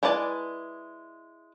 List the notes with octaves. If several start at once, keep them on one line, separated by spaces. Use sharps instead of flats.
G#3 E4 B4 D5 A5